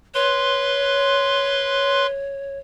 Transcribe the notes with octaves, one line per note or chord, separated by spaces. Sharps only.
B4 C#5 C6